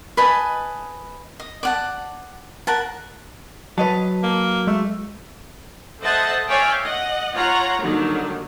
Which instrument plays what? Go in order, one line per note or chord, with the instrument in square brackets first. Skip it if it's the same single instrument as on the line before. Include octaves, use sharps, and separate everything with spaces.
[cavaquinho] B4 D#5 G#5 A5
D#5
D5 F#5 A5
A#4 F#5 A5
[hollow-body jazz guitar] F#3 [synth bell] B4 D#5 A5
[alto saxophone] A#3
[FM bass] G#3 [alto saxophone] A3
[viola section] A4 C5 D#5 E5 F#5 A5
C#5 D5 E5 F5 G5 G#5
D#5 F#5
F4 C#5 F#5 A#5
D3 D#3 F#3 G3 A#3 D#4